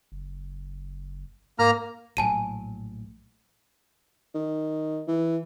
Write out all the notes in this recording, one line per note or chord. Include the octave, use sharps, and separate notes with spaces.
F#1
G#2 A#3 A#5 F6
A#1 A2 F#3 G#5 A5 D#7
D#3
E3